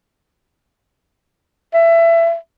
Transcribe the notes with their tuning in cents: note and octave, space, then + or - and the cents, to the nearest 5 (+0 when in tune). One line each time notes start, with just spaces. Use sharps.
E5 +20